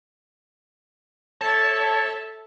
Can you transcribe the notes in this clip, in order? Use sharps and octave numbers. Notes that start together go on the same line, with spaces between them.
A4 C#5 E5 A5